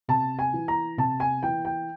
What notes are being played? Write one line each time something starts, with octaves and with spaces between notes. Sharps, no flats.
C3 A5
G#5
E3
A#5
C3 A5
G#5
E3 G5
G5